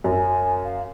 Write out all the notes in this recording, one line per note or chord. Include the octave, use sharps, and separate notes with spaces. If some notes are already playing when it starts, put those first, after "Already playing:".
F#2 G#5
F5